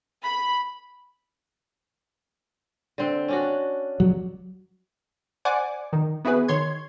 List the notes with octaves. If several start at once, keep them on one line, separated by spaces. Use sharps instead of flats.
B5
D3 C4
C#4 D4 F#4
F#3
C5 D5 F#5 G#5 D6
D#3
B3 E4 F#4 G#4 B4
D#3 C#5 C6 G#6